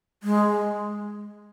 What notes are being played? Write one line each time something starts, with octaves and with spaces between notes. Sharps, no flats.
G#3